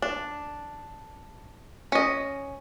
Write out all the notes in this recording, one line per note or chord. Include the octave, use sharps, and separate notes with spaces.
D4
C#4 D#5